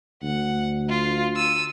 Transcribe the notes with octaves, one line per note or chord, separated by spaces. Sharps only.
D2 F#5
F4
E6 D#7